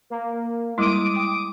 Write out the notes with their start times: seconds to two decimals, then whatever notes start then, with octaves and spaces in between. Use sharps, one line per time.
0.10 A#3
0.78 G3 G#3 E4 D6 D#6 D7
1.16 G5